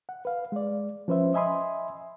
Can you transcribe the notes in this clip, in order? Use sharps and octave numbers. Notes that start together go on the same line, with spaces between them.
F#5
B4 F5
G#3 D5
F3 C#4 B4 C5 E5
D#5 E5 G#5 B5 C6 D#6